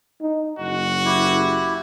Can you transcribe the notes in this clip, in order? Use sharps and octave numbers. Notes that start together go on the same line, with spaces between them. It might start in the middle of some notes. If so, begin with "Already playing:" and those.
D#4
F#1 F#4
E4 G4